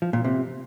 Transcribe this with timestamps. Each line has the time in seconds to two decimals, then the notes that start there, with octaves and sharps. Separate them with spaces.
0.02 F3
0.13 A#2
0.25 C3